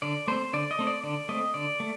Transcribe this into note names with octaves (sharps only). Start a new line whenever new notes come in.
D3 D5
A3 C4 C5
D3 D5
D#5
A3 C4
D5
D3 D5
A3 C4 D#5
D3 D5
A3